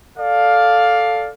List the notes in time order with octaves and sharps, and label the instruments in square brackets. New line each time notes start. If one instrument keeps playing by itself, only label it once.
[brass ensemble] A4 D5 F5